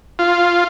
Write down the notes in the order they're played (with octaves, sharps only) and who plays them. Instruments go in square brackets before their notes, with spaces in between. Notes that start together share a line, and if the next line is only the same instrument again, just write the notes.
[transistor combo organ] F4